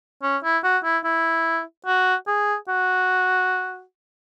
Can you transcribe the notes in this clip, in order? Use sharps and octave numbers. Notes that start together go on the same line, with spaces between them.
C#4
E4
F#4
E4
E4
F#4
G#4
F#4